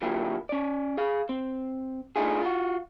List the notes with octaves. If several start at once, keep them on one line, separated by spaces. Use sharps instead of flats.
D3 F#3 A#3 E4 F4 G4
C#4 D5
G#4 F5
C4
A3 D4 D#4 F4 G#4
F4 F#4